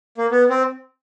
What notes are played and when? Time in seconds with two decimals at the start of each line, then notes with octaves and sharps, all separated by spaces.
0.18 A#3
0.31 B3
0.50 C4